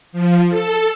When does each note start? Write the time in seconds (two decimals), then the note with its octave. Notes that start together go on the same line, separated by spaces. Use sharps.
0.12 F3
0.49 A4